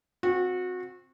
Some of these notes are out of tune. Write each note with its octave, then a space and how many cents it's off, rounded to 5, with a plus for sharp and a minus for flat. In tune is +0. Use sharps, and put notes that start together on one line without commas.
C4 +0 F#4 -25